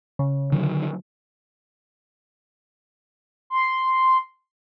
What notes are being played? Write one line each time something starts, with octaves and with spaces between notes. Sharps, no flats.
C#3
D3 D#3 F#3
C6